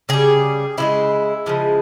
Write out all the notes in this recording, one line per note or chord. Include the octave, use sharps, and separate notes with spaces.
C#3 G3 G#4
C#3 F3 G#3 E4
C#3 F3 G#3